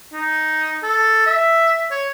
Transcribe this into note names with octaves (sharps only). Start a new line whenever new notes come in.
D#4
A4
E5
C#5